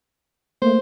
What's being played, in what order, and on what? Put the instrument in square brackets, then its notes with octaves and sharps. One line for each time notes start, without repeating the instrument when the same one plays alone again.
[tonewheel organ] A3 A#3 [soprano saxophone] C5